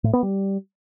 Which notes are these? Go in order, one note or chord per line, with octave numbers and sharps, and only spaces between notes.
A2
B3
G3